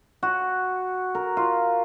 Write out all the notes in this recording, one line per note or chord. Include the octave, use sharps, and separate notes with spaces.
F#4
A#4
F4